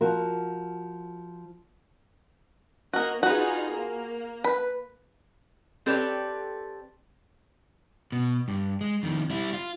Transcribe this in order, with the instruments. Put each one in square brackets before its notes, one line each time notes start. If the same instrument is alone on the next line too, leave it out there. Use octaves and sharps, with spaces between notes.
[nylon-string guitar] F3 F#4 A#4
[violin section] A#3 D#5 [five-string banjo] F#4 A#4
[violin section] D#4 F4 G#4 [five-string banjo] F#4 B4
[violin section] A#3
[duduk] B4 [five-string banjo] B5
[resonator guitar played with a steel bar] C4 G4 A4 B4 C#5 D5
[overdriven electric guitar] B2
G2
G#3
F2 D#3
G3 E4
F4